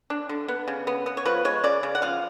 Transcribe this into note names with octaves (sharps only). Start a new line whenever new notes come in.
D4
D3
B3
C#3
B3
B3
C#5
F3 B4
G#3 C#5
C#3 D5
C#3
F#5
F3 F5